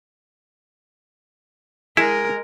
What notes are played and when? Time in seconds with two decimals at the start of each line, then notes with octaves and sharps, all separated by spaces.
1.97 G#3 E4 A#4